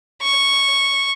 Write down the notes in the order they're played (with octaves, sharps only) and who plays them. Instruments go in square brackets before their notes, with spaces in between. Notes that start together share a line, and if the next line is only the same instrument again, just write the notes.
[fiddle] C#6